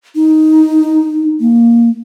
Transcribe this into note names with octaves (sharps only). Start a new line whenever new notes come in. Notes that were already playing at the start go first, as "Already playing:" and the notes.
D#4
A#3